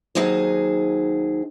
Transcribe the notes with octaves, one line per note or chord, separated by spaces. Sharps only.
D#2 F#3 D#4 G#4 C5